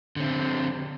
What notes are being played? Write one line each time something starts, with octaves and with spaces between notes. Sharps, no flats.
D3 C4